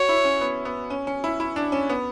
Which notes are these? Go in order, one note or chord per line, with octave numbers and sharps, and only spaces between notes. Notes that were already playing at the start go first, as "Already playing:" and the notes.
Already playing: F#4 C#5
E4
C#4
B3
B3
C#4
C#4
E4
E4
D4
C#4
B3